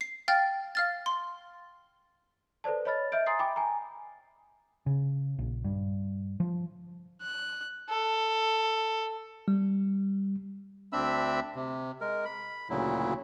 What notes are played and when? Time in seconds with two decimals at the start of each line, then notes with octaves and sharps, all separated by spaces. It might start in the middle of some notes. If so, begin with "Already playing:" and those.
0.01 C7
0.28 F5 G5 F6 A6
0.75 F5 F6 A6
1.06 C6
2.64 A4 B4 C5 D5 A5
2.85 C#5 D#5 B5 F6 A6
3.12 D#5 E5 F6 G6 D7
3.26 G#5 A#5 C6 D#6 A6 C7
3.39 G5 B5 D6
3.56 G#5 A#5
4.86 C#3
5.39 A#1
5.64 G2
6.40 F3
7.22 F#6
7.90 A4
9.48 G3
10.93 D2 C4 D4 E5 B5 E6
11.56 C3
12.01 G#3 A#4
12.25 B5
12.70 D2 A#2 C#3 F#3 E4